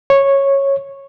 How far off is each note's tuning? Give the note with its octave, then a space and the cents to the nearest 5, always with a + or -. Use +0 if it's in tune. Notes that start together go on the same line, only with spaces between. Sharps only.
C#5 -10